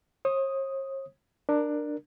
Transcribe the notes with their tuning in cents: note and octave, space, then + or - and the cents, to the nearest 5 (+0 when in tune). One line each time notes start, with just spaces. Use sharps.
C#5 -45 D#6 +0
D4 +15 A#4 +0